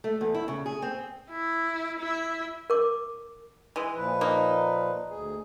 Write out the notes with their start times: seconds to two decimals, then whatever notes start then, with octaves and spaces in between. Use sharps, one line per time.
0.04 A3
0.21 E2
0.34 E4
0.48 C#3
0.66 G#4
0.82 C4
1.31 E4
1.99 E4 E5
2.70 A#4 D6
3.76 E3 G#3
3.96 A#2 F3 B4
4.21 A#3 D#4
5.10 D2 G#4